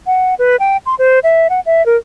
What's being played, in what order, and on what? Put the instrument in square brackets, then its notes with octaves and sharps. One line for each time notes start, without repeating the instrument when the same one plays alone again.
[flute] F#5
B4
G5
C6
C5
E5
F#5
E5
A#4